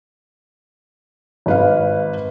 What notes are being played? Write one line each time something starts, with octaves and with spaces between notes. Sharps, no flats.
G#1 B4 F5